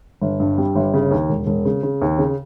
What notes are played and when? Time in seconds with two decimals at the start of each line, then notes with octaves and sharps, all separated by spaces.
0.22 G1
0.40 G2
0.58 G3
0.75 G1
0.94 C#3
1.11 D#2
1.29 E1
1.46 E1
1.65 C#3
1.83 C#3
2.01 D#2
2.18 C#3